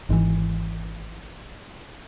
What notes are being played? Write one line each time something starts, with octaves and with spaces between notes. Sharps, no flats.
G#1 G#2 C#3 E3